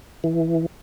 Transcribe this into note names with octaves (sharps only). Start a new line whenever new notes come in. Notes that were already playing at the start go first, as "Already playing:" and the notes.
E3